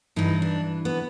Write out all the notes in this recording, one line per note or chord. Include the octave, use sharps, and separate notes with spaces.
G2 E3 D#4
D4
B3